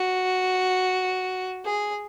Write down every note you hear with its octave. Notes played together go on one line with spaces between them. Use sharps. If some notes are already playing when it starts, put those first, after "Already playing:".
Already playing: F#4
G#4